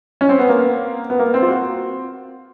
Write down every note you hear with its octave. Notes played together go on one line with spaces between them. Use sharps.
C#4
C4
B3
A#3
B3
A#3
C4
F4
F#4